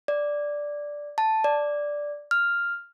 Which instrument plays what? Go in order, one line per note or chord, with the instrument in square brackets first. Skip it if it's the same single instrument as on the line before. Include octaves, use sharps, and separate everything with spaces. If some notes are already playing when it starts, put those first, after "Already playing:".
[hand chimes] D5
A5
D5
F6